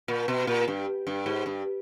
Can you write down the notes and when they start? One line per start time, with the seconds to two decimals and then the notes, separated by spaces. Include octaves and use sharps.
0.08 A#2
0.28 B2
0.47 A#2
0.68 G2
1.07 G2
1.26 G#2
1.46 G2